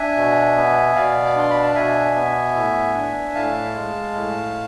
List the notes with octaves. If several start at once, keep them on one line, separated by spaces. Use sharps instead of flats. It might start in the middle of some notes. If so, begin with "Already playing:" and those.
Already playing: D4 E5 G#5
B2
B3
B2 D5 F5
D6
D4 C6
B5
A5
B2 E5 G#5
B3
A2
D4
A2 F5 A5
G#3
A2